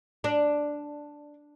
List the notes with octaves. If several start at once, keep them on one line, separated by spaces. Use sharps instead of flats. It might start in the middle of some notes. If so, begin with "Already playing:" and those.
D4